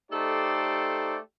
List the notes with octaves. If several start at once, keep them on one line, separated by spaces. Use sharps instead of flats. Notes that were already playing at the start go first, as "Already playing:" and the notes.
A3 D#4 G4 A4 C5 D5